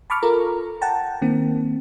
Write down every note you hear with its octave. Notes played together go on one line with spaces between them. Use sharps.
A5 B5 C#6 D6 F6
F4 A4 A#4 A#5
F#5 G5 A5 A#5
D#3 A#3 C4